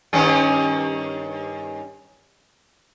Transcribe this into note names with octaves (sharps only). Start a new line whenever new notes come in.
G2 D#3 C#4